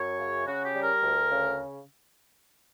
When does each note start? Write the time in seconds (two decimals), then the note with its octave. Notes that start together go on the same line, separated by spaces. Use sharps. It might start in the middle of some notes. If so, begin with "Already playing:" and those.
Already playing: F#2 C#5
0.18 C#3
0.46 C#3 F#4
0.64 G4
0.73 G3
0.82 A#4
1.01 D2
1.29 C#3